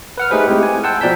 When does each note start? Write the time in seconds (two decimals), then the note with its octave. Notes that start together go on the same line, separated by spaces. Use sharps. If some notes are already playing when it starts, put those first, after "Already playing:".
0.18 B4 F#5 F6
0.31 A3 D#4 G4 G#4 B4 C5
0.46 G#3 C4 E4 G4
0.63 G#5
0.84 F#5 G5 A5 C6 E6 G6
1.01 B2 F3 D5 A#5 G6 B6